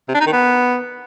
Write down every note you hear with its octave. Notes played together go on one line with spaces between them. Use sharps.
C3
D4
D#4
D#3
B3